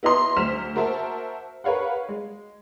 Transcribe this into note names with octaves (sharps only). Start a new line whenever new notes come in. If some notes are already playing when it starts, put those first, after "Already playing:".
B3 E4 D#5 A#5 C6
D2 F#3 C5 F6 B6 E7
A#3 F#4 A#4 C5 E5 A5
A#4 B4 C#5 F5 F#5
G#3